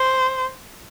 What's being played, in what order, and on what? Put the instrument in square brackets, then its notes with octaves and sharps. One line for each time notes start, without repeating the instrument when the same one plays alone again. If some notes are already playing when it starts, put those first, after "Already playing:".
Already playing: [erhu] C5